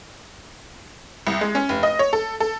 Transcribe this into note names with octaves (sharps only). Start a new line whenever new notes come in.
C2
G#3
C#4
F1
D#5
C#5
A4
A4